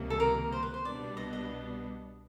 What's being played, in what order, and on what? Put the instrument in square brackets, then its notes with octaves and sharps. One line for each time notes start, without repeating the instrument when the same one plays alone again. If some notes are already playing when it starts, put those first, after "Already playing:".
Already playing: [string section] C#2 C3 D#3 G3 A#3
[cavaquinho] A4
A#4
C5
B4
C5
[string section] C2 B2 G3 B3 D4 [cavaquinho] D5
[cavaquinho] D#5
D#5